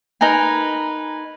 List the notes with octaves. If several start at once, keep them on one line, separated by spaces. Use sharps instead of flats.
D#4 A#4 B4 G#5